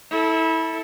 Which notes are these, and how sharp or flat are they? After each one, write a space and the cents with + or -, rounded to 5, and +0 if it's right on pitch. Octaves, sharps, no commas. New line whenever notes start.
E4 -25 A4 +0